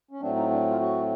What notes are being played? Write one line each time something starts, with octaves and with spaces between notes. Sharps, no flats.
C#4
A2 F#3 A3 C4 D4
D#4
D4
F4
F#4